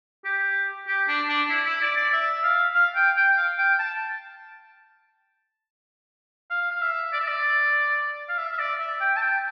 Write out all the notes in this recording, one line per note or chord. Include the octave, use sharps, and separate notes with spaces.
G4
G4
D4
D4
E4
E4
D5
D5
E5
F5
F5
G5
G5
F5
G5
A5
F5
F5
E5
D5
E5
D5
F5
E5
E5
D5
E5
G5
A5
G5